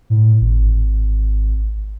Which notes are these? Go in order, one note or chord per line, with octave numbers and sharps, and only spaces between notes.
A2
G#1